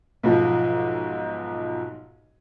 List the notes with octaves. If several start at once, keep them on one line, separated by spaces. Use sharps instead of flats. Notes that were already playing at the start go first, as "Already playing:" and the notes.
B1 G#2 F3